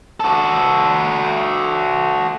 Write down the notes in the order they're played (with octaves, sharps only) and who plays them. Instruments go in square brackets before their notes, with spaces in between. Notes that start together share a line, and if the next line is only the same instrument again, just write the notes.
[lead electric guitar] F#4 A4